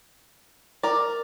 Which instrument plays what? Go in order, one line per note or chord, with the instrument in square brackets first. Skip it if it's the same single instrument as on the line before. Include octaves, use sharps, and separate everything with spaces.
[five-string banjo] A#4 D5